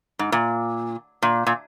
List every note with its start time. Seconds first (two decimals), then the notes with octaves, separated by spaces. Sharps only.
0.19 G#2
0.32 A#2
1.22 A#2
1.47 A#2